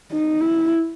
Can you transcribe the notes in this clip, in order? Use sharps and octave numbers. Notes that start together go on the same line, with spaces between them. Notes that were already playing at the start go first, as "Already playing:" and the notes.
D#4
E4